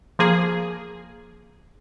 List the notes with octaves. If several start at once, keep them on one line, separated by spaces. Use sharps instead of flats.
F3 A#3 G#4